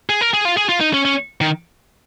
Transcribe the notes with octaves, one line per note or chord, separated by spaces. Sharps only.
G#4
A#4
G#4
F4
G#4
F4
D#4
C#4
C#4
D#3